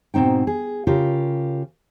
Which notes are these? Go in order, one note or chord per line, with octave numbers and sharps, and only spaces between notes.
G#2 B2 C4 D#4 G5
G#4
C#3 F4 G4 A#4